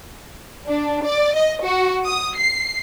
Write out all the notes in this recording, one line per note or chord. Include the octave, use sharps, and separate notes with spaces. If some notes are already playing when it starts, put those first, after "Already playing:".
D4
D5
D#5
F#4
D#6
C7